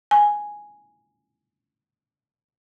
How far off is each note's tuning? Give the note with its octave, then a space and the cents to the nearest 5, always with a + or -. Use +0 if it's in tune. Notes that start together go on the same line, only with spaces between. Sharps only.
G#5 +0